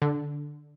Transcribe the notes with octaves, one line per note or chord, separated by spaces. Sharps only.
D3